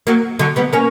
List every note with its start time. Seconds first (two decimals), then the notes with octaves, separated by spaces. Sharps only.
0.07 F#3 A#3
0.39 D3 F#3
0.56 G3 B3
0.73 A#3 C#4